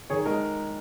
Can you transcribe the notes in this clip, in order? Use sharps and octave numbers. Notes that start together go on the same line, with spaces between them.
D#3 G#4 C#5
G#3 A#4 D#5